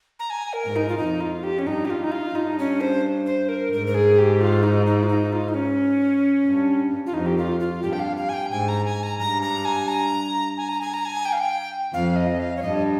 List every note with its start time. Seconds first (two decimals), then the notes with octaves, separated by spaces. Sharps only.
0.19 A#5
0.30 G#5
0.53 A#4
0.65 G#2
0.76 D#4
0.89 F4
0.98 F2 D#4
1.21 F4
1.43 G4
1.59 C#4
1.67 G2 D#4
1.85 G4
1.90 F4
2.04 D#4
2.12 F4
2.35 G2 D#4
2.59 C#4
2.81 C5
3.26 C5
3.49 A#4
3.73 G#2 A#4
3.87 A#4
3.95 G#4
4.18 G4
4.41 F4
4.63 D#4
4.86 D#4
5.03 F4
5.09 D#4
5.33 F4
5.48 D#4
5.54 C#4
6.47 G2
7.06 F4
7.14 F2 D#4
7.26 G4
7.37 F4
7.60 F4
7.83 G2 G4
7.93 G5
7.99 F5
8.17 F5
8.29 G#5
8.34 G5
8.51 G#2 G#5
8.68 A#5
8.85 G#5
9.03 A#5
9.19 G2 A#5
9.42 A#5
9.65 G#5
9.88 A#5
10.57 G#5
10.69 A#5
10.81 G#5
10.94 A#5
11.05 G#5
11.25 G5
11.33 F5
11.40 G5
11.93 F2 F5
12.16 D#5
12.40 F5
12.57 C#5
12.62 G2 D#5